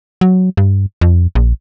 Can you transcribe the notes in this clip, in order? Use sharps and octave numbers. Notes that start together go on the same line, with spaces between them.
F#3
G2
F2
A#1